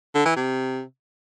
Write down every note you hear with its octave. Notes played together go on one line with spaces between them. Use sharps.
D3
E3
C3